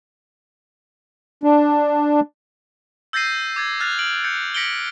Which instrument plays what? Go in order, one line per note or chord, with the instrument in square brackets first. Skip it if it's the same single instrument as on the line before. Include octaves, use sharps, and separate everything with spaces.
[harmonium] D4
[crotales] E6 G6 A6 A#6 C7 D#7
D6 G#6 A6
F6 F#6 A6 A#6 F7
F6 D7 F#7
G6 A6 C#7
A#6 B6 C#7 D7 F#7 G7